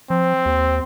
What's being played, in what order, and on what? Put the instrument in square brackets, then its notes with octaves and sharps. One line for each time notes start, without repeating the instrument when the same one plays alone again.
[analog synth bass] F3 [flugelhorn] C4
[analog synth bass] D#2